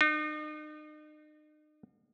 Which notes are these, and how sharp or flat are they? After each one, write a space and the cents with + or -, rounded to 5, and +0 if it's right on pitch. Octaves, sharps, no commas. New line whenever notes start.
D#4 -40